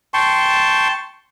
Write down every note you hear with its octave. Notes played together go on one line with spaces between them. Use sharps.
G5 A5 C6 C#6